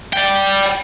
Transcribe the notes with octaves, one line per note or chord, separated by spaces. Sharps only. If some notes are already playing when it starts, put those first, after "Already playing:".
D5 G5